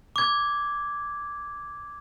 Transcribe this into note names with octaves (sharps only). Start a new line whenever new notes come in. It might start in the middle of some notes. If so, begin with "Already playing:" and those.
D6 G#6